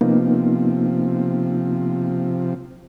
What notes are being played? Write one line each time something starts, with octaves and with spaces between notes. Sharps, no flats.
C3 F3 A#3 B3 D#4